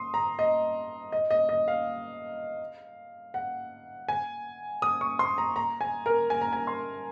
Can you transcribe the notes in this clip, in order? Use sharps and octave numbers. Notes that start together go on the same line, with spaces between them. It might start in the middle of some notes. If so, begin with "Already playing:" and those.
Already playing: C6 D#6
A#5
D#5
D#5
D#5
D#5
F5
F#5
G#5
D#6
C#6
C6
A#5
A#5
G#5
A#4
G#5
A#5
G#5
C6